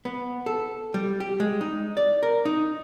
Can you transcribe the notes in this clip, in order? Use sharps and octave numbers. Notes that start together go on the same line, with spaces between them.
B3
A4
G3
G4
G#3
D#4
D5
A#4
D#4